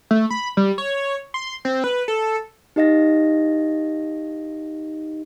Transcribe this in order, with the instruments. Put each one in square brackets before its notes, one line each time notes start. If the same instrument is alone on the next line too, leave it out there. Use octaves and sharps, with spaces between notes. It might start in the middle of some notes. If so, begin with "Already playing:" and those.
[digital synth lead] A3
B5
G3
C#5
C6
C4
B4
A4
[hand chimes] D#4 G4 D#5 F5 A#6